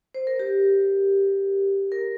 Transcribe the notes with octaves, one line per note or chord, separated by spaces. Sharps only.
C5
A#4
G4
A#4